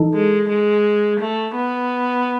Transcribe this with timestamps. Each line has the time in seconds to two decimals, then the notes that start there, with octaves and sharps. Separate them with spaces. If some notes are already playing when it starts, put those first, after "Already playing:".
Already playing: E3 D#4 A4
0.14 G#3
0.49 G#3
1.20 A3
1.55 B3